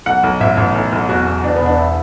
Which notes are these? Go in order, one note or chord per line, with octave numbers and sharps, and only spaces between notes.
B1 F#5
B1
A1 E5
A1
B1
B1
E2 F#4
E2
E1 D4
B3
E1
D4
E4